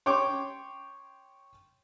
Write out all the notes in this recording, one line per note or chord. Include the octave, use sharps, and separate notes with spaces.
C#5 G5 C6 D6